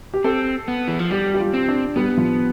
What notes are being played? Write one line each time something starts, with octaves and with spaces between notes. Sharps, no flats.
G4
C4 A4
B3
E3
F3
G3 G4
G4
F4
C4
D4
G3 B3
F3